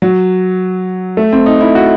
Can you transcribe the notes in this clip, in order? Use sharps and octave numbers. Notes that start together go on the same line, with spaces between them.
F#3
A3
C4
D#4
E4
F#4